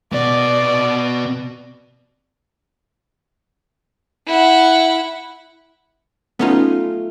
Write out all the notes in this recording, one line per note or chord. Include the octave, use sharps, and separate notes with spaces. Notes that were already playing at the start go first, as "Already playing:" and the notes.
B2 B3 D5
E4 F#5
A3 B3 C#4 D#4 F4